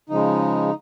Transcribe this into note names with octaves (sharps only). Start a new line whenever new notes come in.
C#3 F3 G#3 D#4